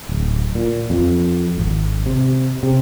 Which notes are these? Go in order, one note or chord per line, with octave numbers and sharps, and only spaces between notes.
D1
A#2
F2
G#1
C3
C3